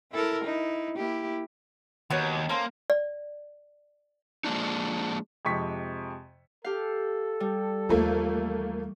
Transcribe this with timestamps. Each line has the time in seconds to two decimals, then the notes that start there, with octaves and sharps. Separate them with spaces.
0.12 E4 A4 A#4
0.44 D#4 E4
0.97 A#3 E4 G4
2.10 D#2 B3 F#4 C#5
2.49 A#3 C#4 A4 C5
2.90 D5
4.44 F3 G#3 A#3 D4 D#4
5.45 F2 C3 G#3 C#6 B6
6.64 G4 A4 F5
7.40 G3
7.89 D#2 E3 F3 A3 A#3